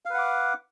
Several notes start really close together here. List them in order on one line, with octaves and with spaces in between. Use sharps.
F5 B4 F#5 D6